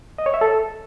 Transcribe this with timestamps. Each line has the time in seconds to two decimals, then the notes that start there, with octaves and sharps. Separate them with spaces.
0.18 D#5
0.26 C#5
0.34 E5
0.41 A4